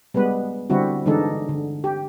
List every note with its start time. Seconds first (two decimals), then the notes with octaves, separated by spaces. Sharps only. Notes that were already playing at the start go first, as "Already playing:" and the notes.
0.14 G3 G#3 B3 B4
0.70 D3 G3 C4 E4 F#4
1.06 D3 E3 G#3 D4 D#4 A4
1.49 D3
1.84 G4